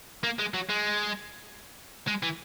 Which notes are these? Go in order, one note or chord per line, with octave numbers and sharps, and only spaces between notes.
A#3
G#3
F#3
G#3
G#3
E3